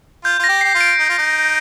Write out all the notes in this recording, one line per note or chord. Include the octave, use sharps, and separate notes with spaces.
F4 G6
F4 A#6
G4
G4 C7
F4
D7
D#4
F4
D#4